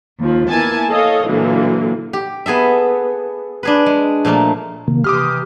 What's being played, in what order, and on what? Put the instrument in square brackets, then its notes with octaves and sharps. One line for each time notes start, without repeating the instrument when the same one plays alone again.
[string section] D#2 F3
A#3 B3 E4 G#5 A5 G#6
A4 C#5 D#5 F5
A#2 D3 E3 F#3 A#3
[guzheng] G4
B3 G#4 A4 E5
D4 G#4 B4
G#3
A#2 F3 A3 A#3
[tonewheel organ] C3 D#3 A#3
[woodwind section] C3 E3 G4 [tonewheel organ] C6 [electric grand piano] D6 D#6 F6